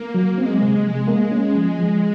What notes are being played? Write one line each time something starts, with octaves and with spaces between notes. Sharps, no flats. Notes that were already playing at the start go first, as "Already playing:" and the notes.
Already playing: A#3
F#3
G#3 C4
C3
F3
A#3
C#4
F3
F3